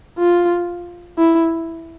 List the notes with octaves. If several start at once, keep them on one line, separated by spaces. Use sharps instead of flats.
F4
E4